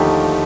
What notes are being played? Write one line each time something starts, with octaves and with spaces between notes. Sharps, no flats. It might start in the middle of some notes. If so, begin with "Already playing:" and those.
Already playing: D#2 D3 F3 A3 D#4 G4